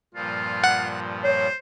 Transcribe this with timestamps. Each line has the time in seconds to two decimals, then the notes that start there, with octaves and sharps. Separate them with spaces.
0.14 G2 A#2 F3 F4
0.64 F#5
1.24 C5 C#5